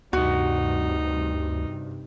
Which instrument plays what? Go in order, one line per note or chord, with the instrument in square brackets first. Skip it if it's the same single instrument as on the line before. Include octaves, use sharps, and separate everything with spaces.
[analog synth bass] D2 [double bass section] G2 C3 [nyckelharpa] D#4 [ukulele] F#4